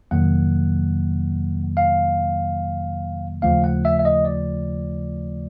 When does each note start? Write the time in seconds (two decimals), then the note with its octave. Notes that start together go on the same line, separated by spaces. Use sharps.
0.11 F2 C3 D#3 F#3 A#3 F#5
1.77 F5
3.42 D#2 C#3 F3 A3 F5
3.64 F#5
3.85 E5
3.99 E5
4.05 D#5
4.25 D5